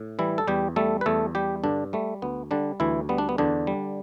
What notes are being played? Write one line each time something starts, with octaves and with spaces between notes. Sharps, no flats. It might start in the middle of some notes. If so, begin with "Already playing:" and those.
Already playing: A2
E3 G3 E4
A4
E2 G3 G4
G3 A3 A4
B4
E2 A3 A4
G3 G4
G2 D3 D4
G3 A3
D2 B3
D3 G3 D4
D2 E3 E4
G3 B3
D4
B3
E2 D3 D4
G3